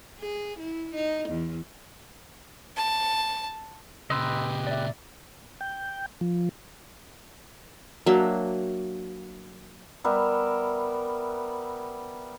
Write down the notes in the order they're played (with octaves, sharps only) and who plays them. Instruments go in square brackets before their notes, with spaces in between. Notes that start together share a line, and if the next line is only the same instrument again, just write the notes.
[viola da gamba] G#4
E4
D#4
E2
[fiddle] A5
[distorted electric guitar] A#2 C#3 [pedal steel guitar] G4 B4 D#5 [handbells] C6 E6
[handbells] D5 E5
[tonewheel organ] G5
F3
[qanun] F#3 A#3 D4 E5
[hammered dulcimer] G3 B3 A#4 E5